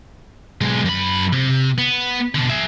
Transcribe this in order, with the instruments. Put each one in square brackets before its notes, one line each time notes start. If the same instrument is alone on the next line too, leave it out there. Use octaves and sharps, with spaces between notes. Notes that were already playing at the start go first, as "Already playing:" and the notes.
[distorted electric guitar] B1 G#3
F#2 B5
C3
B3
B2 D3
G#4 E5